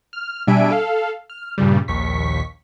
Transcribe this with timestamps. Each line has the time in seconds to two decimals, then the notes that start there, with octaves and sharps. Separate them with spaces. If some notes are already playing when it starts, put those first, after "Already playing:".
0.13 F6
0.47 B2 G3 D4 E5 G#5 D7
0.71 A4 F5
1.30 F6
1.58 G2 A#2 C#3 G3
1.88 A#1 D#2 C#6 B6